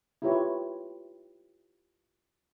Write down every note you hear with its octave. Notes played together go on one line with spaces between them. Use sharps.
E4 F4 G4 B4 C#5